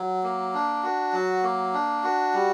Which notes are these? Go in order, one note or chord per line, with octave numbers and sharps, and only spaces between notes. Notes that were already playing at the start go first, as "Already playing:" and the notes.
Already playing: F#3
A#3
D4
F#4
F#3
A#3
D4
F#4
G3